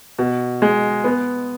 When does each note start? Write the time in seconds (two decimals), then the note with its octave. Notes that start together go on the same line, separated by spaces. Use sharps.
0.19 B2
0.62 G#3
1.04 B3